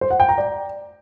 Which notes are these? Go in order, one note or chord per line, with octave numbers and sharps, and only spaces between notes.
C5
F#5
G5
A#5
D5